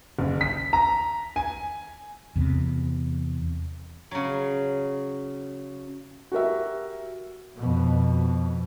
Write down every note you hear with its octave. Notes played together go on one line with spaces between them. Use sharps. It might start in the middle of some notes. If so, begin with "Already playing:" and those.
F#1
B6
A#5
G#5
E2 C3
C#3 F#3
F#4 G4 A#4 E5
F2 B2